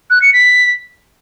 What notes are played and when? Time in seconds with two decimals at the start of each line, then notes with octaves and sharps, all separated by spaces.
0.10 F#6
0.22 C#7
0.33 B6